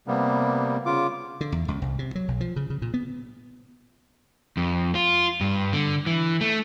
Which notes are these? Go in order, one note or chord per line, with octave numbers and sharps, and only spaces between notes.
C3 G3 A#3 B3
C#3 F4 D6
D3
E2
C#2
C2
C3
F#3
B1
F3
C#3
C#3
A#2
B3
F2
F4
G2
D3
E3
A3